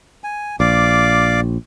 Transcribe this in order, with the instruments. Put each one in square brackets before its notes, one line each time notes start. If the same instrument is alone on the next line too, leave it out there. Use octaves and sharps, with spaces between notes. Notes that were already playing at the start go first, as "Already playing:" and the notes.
[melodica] G#5
[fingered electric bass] A#1 [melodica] D5 F5 D6